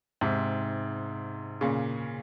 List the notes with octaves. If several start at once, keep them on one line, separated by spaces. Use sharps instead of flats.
G#2 C3
A#2 C#3